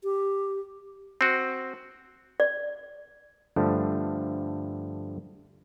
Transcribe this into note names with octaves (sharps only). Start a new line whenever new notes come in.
G4
C4 F#4
D5
G2 D3 F3 A3